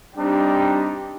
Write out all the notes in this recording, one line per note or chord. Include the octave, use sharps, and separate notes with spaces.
G3 C4 D4 D#4 G4